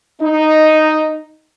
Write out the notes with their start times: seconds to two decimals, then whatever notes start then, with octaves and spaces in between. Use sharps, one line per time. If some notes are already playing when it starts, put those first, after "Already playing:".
0.22 D#4